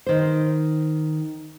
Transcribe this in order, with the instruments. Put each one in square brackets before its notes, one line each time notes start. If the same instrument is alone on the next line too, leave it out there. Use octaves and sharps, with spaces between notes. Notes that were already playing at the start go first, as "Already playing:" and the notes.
[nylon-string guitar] D#3 C5